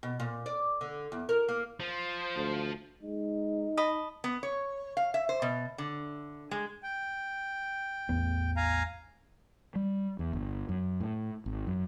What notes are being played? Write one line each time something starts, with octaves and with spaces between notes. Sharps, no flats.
B2
A#2
D5
D3
E2
A#4
A#3
F3 C5
D2
G#3 D#4
D#5 A5 B5
B3
C#5
F5
E5
C5
B2
D3
G#3
G5
A1 E2 B3
F5 G#5 A#5
G3
E2
G1
F#2
A2
G#1
F#2